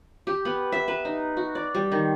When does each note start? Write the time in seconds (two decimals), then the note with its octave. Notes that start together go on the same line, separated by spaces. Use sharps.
0.27 G4
0.45 B3
0.72 E5
0.88 B4
1.05 D#4
1.37 F#4
1.55 D5
1.75 G3
1.92 D#3